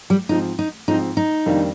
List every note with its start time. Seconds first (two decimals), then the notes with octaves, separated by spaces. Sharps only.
0.10 G3
0.29 G#2 F3 C4 D#4
0.59 D#4
0.88 G#2 F3 C4 D#4
1.17 D#4
1.46 F2 D#3 G3 A#3 D4